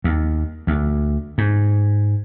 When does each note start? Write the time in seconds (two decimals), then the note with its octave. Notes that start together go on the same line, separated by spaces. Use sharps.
0.04 D#2
0.67 D2
1.38 G#2